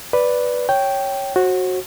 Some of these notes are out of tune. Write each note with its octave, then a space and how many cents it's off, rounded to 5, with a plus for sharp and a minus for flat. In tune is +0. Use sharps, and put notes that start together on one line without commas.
B4 +0 D5 +0
C#5 +0 G5 -5
F#4 -5 C5 +40